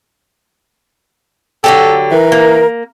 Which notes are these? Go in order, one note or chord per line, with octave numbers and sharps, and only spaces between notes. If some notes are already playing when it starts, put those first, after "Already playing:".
D3 F#3 G4 A4
E3 A#4
A#3